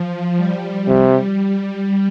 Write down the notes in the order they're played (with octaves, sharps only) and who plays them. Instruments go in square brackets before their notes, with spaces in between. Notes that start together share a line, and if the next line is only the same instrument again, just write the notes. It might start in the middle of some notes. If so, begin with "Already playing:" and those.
Already playing: [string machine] F3
G3
[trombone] C3 [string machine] G3